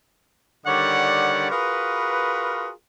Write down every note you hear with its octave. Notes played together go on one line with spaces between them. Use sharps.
D3 D#3 G3 C#5 D5 F#5
F4 F#4 G#4 A#4 B4